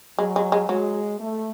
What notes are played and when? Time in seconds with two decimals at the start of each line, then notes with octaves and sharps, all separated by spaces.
0.19 F#3 G#3
0.36 G#3
0.52 G#3
0.69 F#3 G#3
1.19 A3